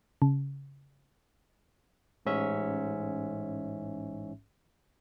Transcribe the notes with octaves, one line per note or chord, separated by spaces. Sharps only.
C#3
A1 G#2 C#4 E5